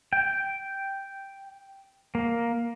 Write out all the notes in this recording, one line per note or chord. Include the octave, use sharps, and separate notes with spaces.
G5
A#3